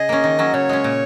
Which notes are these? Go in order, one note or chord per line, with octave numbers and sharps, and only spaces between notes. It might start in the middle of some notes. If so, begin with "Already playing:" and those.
Already playing: C#3 G#4 D#5
A#3 C#4
D#3
F#3 C#4
C#3 C#5
G#3 C#4
A#2